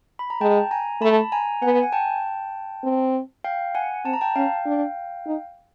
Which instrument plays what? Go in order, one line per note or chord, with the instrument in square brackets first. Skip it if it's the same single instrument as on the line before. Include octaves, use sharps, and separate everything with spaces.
[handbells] B5
A#5
[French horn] G#3 [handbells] G5 A5
[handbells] G#5 A#5
[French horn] A3 [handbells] A5 B5
[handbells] G#5 A#5
[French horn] B3 [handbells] F#5 G#5
[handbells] G#5
G5 A5
[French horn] C4
[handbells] F5 G5
F#5 G#5
[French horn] C4 [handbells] A5
[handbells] A#5
G5 A5
[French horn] C#4 [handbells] F5 G5
[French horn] D4
D#4